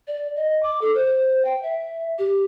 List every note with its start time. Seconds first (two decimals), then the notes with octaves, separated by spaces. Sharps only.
0.07 D5
0.36 D#5
0.63 D6
0.81 A4
0.94 C5
1.45 G5
1.63 E5
2.19 G4